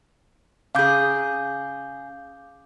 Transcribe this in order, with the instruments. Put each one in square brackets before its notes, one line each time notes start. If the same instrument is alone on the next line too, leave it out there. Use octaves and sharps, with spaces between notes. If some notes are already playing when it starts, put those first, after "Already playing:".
[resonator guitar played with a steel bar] C#3 G#4 [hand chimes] F5 D6 G6